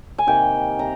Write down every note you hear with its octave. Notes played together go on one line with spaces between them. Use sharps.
G#5
C3 D#3 A#3 G5
C3 A#5